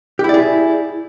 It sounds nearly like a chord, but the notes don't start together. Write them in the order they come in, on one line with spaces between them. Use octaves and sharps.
G4 E4 D5 G#4